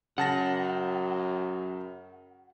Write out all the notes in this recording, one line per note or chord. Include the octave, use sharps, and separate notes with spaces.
F#2 C#3 F#5 A5 A#6